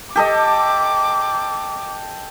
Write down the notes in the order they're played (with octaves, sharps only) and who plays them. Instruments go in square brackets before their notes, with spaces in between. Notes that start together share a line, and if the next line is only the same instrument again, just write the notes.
[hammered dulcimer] G4 A4 D#5 [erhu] D6